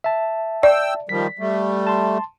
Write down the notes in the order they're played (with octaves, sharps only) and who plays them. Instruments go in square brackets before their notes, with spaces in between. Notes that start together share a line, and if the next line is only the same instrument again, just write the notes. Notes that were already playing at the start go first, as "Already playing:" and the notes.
[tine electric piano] E5 A5
[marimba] D5 [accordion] G5 E6
[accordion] D#3 F3 G3 [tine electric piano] B6
[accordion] G3 A3
[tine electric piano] A5 C6